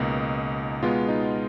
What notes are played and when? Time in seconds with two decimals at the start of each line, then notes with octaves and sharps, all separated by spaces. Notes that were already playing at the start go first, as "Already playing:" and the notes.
Already playing: C#2 B2 A#3 D#4
0.83 B2 G#3 B3 F4
1.08 D#4